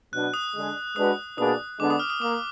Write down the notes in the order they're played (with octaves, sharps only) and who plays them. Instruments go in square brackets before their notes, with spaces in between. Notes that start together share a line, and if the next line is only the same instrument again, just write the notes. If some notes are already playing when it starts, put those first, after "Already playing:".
[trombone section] B2 F#3 B3 D4 [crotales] F#6
[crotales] D#6
[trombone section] D3 G#3 D4 G#4
[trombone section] G#3 D4 F#4 B4 [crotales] D#6
[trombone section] B2 A#3 D4 G#4 B4 [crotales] D#6
[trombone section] D3 G#3 B3 D4 [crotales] D6
[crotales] D#6
F6
D#6
[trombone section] A#3 [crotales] D6